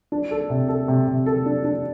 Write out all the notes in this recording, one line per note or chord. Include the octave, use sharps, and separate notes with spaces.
D4
A4
C3
A4
C3
C3
A4
D4
D4